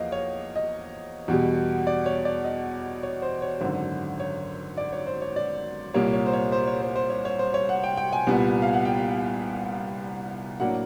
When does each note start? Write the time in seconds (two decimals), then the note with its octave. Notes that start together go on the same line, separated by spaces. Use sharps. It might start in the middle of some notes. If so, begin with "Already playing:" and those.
Already playing: E2 F3 A#3 D#5 F5
0.12 C#5
0.56 D#5
1.28 E2 B2 G3
1.87 D5
2.06 C#5
2.25 D5
2.44 D#5
3.03 C#5
3.22 C5
3.42 C#5
3.61 G#1 F#2 D3 C5
4.20 C#5
4.78 D5
4.92 C#5
5.07 C5
5.22 C#5
5.36 D5
5.94 C2 A#2 G3 A#3 C#5
6.13 C#5
6.26 C5
6.33 C#5
6.52 C5
6.67 C#5
6.82 C5
6.96 C5
7.10 C#5
7.25 C#5
7.39 C5
7.54 C#5
7.69 F#5
7.83 G5
7.97 G5
8.13 G#5
8.27 C2 A#2 G3 B3
8.62 F5
8.73 F#5
8.85 G5
10.60 A2 F#3 A#3 D4 F#5